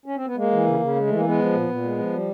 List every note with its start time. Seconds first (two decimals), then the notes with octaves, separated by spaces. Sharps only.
0.06 C#4
0.16 C4
0.26 B3
0.36 G#3 A#3
0.51 E3
0.65 C#3
0.80 C#3
0.96 G#3
1.07 E3 A3
1.16 A#3
1.24 G#3 B3
1.39 F3
1.53 A#2
1.69 A#2
1.84 G#3
1.99 F3
2.13 G3